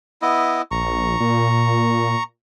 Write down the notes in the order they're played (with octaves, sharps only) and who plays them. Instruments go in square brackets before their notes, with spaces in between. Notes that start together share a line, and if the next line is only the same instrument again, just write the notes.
[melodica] B3 E4 D#5
[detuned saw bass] A#1 [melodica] A#5 C#6
[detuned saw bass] A#2